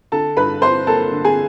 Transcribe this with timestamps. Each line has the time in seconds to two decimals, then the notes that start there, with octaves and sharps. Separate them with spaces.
0.12 D3 A4 A5
0.37 G2 B4 B5
0.62 D3 C5 C6
0.87 A#3 A4 A5
1.12 D3
1.24 G#4 G#5